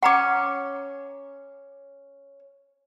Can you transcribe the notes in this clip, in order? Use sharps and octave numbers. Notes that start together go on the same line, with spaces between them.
C#4 F#5 A#5 C#6 D6